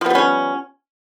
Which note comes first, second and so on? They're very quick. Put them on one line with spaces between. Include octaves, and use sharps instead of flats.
F3 B3 G3 C#4